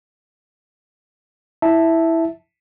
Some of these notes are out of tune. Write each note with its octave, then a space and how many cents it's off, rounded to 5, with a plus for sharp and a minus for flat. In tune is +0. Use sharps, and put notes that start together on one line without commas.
E4 -5 E5 +0 A5 +0